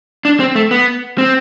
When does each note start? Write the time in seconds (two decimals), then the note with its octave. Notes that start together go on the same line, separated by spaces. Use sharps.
0.25 D4
0.40 C4
0.55 A3
0.71 B3
1.18 C4